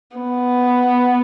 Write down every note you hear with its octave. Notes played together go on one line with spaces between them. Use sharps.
B3